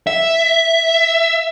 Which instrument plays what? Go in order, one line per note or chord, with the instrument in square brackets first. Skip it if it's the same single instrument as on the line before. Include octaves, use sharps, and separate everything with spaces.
[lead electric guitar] E5